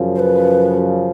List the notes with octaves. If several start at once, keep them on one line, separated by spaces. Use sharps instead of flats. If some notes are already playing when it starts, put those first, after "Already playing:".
Already playing: F#2 C#3 F3
C5
B4